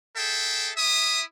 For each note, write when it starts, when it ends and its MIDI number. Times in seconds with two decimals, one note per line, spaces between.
0.16 0.71 68
0.16 0.71 69
0.16 0.71 76
0.16 0.71 79
0.77 1.23 64
0.77 1.23 76
0.77 1.23 87